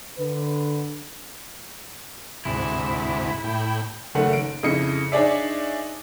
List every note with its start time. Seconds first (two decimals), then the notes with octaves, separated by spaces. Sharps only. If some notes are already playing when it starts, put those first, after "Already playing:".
0.18 D3 B4
2.45 D2 G#2 C3 E4
3.44 A2 G5
4.15 F#1 D#3 A3 F#5
4.33 D7
4.63 F2 C#3 E4 D#5 C#7
5.12 D4 D#4 G#4 C#5 D5 E5